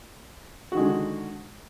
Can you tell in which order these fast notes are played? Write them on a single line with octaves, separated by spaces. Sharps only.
F#4 D#3 G#3 D3